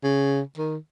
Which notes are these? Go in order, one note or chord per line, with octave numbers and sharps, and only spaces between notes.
C#3
D#3